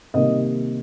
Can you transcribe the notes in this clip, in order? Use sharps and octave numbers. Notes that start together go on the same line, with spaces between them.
C3 D#3 G3 A#3 D#5